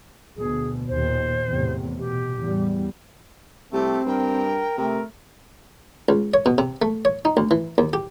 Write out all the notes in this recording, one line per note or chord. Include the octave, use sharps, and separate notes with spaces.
D2 B2 G#4
D#2 A#2 C5
E2 A2 C3
B2 G4
E2 A2 G3
C2 A3 C4 G4
G2 A#4 G5
C3 A3 A#4
C#2
C#5
B2
C3
A3
C#5
D#4
D2
E3
D#2
G4